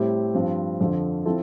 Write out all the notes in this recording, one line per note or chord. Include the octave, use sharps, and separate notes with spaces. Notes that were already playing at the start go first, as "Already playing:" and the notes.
Already playing: A2 G3 C4 E4 G4
G2 F3 C4
F2 D3 F3
F3 C4 E4 A4